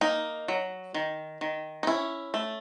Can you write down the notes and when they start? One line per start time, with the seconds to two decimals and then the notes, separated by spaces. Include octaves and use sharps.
0.01 A#3 D#4
0.48 F#3
0.94 D#3
1.41 D#3
1.83 D#4
1.87 C#4 E4
2.34 A3